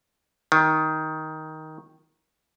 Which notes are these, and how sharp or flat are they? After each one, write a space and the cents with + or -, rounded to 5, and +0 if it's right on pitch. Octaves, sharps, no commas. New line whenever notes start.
D#3 +10